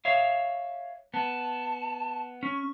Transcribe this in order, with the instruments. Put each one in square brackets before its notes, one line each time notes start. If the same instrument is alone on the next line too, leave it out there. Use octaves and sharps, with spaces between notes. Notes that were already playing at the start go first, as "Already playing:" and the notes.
[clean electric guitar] C#5 E5 F5
[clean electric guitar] B3 [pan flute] A5
[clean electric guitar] C#4 [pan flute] C#6